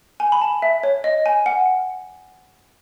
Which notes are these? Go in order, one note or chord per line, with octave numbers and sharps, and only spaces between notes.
G#5
B5
A5
E5
C#5
D#5
G#5
F#5